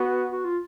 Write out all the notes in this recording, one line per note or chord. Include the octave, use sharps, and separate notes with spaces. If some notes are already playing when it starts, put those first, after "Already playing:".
Already playing: B3 F#4
F#4
F4